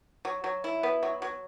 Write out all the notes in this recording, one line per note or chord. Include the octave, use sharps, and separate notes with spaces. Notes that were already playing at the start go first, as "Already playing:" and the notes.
F#3
F#3
E4
B3
F#3
F#3